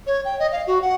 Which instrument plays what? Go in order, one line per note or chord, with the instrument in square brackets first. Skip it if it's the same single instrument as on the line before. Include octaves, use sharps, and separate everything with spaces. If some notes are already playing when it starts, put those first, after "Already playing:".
[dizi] C#5
G5
D#5
F5
F#4
F#5